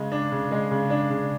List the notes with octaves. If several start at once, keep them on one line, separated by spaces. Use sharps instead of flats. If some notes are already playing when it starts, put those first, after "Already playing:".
Already playing: C#3 G#3
D4
C#3
G#3
C#3
D4
C#3